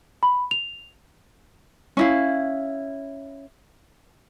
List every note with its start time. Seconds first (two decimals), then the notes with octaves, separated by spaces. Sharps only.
0.23 B5
0.51 F7
1.97 C#4 E4 F5